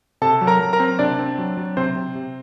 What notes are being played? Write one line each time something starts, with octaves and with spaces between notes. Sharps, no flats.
C3 A4 A5
F#3
A#4 A#5
F#3
A#4 A#5
C4
C3 D4 D5
C4
F#3
F#3
C3 C4 C5
C3
C3